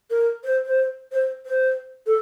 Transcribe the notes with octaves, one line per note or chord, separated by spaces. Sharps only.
A#4
C5
C5
C5
C5
A4